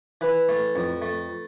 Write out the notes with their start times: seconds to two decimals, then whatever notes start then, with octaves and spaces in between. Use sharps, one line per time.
0.21 E3 B4
0.49 A3
0.76 F2
1.02 A3